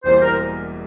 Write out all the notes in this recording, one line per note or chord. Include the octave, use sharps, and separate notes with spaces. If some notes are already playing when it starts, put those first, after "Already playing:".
E1 E2 E3 G3 A#3 C5
A#4